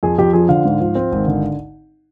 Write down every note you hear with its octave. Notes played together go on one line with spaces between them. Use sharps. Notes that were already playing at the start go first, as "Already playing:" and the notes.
F2 G#4
F2 G4
F3 G#4
D3 F5
G#2
F3
C4
G#1
D3